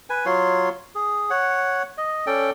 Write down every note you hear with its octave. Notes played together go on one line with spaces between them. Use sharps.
B4 G#5
F#3 F4 C#5 C6
G#4
C#5 F#5
D#5
C#4 A4 D5 G5